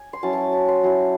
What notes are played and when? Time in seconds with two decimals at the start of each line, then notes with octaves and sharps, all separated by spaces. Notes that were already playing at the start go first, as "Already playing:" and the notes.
Already playing: G#5
0.13 C6
0.23 F#3 C#4 E4 A5
0.33 A5 C6
0.53 A5
0.68 C6
0.83 F#3 C#4 E4 C6